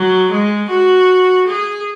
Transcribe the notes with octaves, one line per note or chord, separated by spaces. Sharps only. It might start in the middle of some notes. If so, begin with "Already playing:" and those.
Already playing: F#3
G#3
F#4
G#4